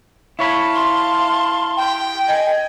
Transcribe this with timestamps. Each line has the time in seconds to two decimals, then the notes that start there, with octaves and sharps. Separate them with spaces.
0.39 E4 C#5 F5 A5 B5
0.75 C6
1.77 G5
2.28 D#5 G#5